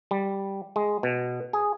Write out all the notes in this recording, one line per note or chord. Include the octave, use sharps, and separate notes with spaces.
G3
G#3
B2
G#4